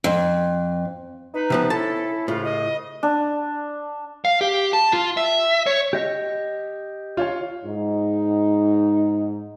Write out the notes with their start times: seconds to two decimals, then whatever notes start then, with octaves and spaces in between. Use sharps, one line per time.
0.04 F2
1.34 D#4 B4
1.50 C3 F3 B3
1.70 A3 C#4 E4 A4 A5
2.28 C2 A2 C#3 F4
2.44 D#5
3.03 D4
4.25 F5
4.41 G4
4.73 A5
4.93 F4
5.17 E5
5.66 C#5
5.93 G4 D#5
7.17 F4 C#5 F5
7.65 G#2 D#4